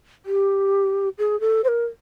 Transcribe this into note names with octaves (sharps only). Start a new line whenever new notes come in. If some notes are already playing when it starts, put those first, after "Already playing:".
G4
G#4
A4
C5
A#4